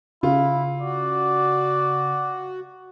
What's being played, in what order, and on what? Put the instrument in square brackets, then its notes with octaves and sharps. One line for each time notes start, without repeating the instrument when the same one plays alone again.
[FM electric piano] C#3 [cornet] E4 [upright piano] F4
[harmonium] F#4 [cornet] D5